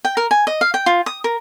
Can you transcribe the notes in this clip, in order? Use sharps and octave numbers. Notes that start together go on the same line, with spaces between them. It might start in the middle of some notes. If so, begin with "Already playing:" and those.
G5
A#4
G#5
D#5
F5
G5
F4
D#6
A#4